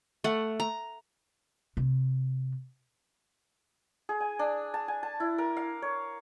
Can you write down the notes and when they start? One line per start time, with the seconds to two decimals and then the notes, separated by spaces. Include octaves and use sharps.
0.24 A3 F#5
0.60 A#5
1.77 C3
4.09 G#4
4.20 G#5
4.39 D4
4.74 A5
4.88 G#5
5.03 A5
5.20 E4
5.38 A#4
5.57 F5
5.82 C#5